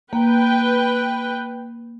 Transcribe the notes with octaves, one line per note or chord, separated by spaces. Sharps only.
A#3 B4 G5